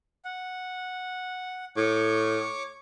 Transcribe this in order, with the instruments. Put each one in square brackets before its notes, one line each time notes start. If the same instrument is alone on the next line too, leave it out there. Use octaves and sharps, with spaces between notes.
[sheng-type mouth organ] F#5
[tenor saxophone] A2 [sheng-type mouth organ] C#5 C#6 D6